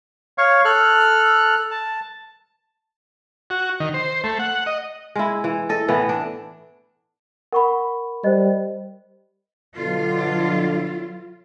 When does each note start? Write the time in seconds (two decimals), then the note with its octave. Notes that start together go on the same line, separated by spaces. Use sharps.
0.38 C#5 F5 C#6
0.65 A4 F6 F#6
1.71 A5
3.50 F#4
3.80 D#3
3.94 C5
4.24 A3
4.39 F#5
4.66 D#5
5.15 G#3 E4
5.44 E3
5.69 A4 D#5
5.88 A2 E3 B3
6.09 D4
7.53 A#4 F#5 B5 C#6
8.24 G3 C5 D#5
9.77 B2 D3 F#3 F4